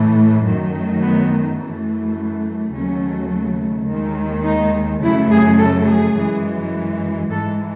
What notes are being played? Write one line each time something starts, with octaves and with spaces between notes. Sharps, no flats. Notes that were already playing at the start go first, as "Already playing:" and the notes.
Already playing: A2 E3 A3
F#2 D#3 F#3 A3
B3
F#2 E3 A3
D#2 C#3 F#3 A3 C#4
D#2 D#3 G#3
D#4
F#2 C#3 F#3 A3 E4
G#4
A4
G#4
F#2 E3 G#3
G#2 E3 G#3 A4